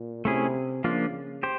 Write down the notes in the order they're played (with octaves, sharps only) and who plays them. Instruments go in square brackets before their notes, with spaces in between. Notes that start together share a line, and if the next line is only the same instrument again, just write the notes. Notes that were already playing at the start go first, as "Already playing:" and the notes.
Already playing: [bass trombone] A#2
[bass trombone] C3 [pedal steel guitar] A3 C#4 E4 G#4
[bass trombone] C#3 [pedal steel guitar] F3 A#3 D4 F4
[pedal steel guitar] G4 C5